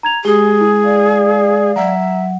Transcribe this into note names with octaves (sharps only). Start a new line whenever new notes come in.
A#5 G#6 F7
G#3 G4 G#4 G7
E4
D5 F5
F#3 E5 A#5